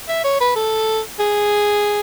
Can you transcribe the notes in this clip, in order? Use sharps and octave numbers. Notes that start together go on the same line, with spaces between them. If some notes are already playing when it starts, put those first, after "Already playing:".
E5
C#5
B4
A4
G#4